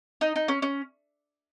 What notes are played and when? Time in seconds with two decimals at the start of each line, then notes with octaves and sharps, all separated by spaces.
0.21 D#4
0.36 D#4
0.48 C#4
0.62 C#4